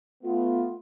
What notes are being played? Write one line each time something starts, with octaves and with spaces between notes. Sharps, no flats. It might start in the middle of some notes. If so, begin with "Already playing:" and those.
A3 B3 F4